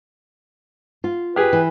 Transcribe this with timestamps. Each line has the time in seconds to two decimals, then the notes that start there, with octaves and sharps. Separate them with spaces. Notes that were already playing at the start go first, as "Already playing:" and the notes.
1.04 F4
1.36 G4 G#4 B4
1.53 E3